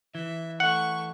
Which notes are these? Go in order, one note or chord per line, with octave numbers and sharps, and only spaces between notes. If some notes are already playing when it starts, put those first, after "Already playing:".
E3 E5
A3 F#5 C#6